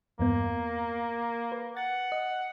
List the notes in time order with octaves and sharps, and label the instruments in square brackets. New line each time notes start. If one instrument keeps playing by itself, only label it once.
[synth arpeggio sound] E2 G2 B3 [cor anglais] A#3
[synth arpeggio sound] B4
[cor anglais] F#5 [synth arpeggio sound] A6
[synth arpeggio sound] D#5